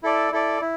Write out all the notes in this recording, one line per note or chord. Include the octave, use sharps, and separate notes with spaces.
E4 A4 D5
E4 A4 D5
E4